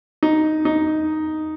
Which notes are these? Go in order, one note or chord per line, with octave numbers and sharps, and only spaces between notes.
D#4
D#4